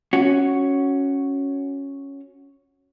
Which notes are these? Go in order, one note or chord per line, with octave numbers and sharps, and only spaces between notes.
C#4 F#4